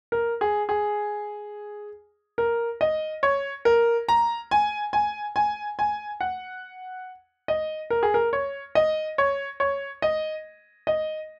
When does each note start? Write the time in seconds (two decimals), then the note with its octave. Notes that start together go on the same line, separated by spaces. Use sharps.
0.12 A#4
0.41 G#4
0.69 G#4
2.38 A#4
2.81 D#5
3.23 C#5
3.65 A#4
4.09 A#5
4.51 G#5
4.93 G#5
5.36 G#5
5.79 G#5
6.21 F#5
7.48 D#5
7.90 A#4
8.03 G#4
8.14 A#4
8.33 C#5
8.75 D#5
9.18 C#5
9.60 C#5
10.02 D#5
10.87 D#5